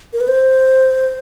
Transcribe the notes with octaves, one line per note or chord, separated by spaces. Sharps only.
A#4
B4
C5